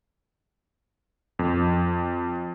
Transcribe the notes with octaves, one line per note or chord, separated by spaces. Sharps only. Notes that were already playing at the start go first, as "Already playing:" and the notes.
F2